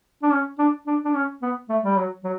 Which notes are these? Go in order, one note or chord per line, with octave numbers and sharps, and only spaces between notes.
D4
C#4
D4
D4
D4
C#4
B3
A3
G3
F#3
F#3